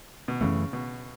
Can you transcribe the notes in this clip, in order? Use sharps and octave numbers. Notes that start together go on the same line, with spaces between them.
B2
F#2 C#3 E3 A3
B2